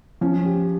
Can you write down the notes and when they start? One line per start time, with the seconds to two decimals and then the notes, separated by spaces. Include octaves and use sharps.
0.21 F3 C#4
0.45 G4